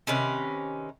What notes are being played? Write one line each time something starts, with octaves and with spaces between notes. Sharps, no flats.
C3 D#3 C#4 B4